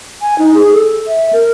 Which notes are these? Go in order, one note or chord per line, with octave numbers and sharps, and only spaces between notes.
G#5
D#4
G#4
A4
E5
A#4